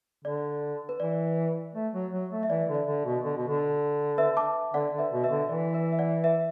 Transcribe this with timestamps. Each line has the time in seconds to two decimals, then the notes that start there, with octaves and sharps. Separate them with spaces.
0.24 D3 D5
0.89 B4
1.00 E3 D5
1.75 A3
1.94 F#3
2.13 F#3
2.31 A3
2.43 E5
2.49 E3 D5
2.68 D3
2.75 D5
2.87 D3
3.05 B2
3.24 D3
3.37 B2
3.48 D3
4.18 B4 E5
4.37 A5 D6
4.74 D3 D5 F#5
4.93 D3
4.99 B4 E5
5.12 B2
5.24 B4 E5
5.31 D3
5.49 E3 D5
5.74 B4 E5
5.92 E5
5.99 D5 F#5
6.24 B4 E5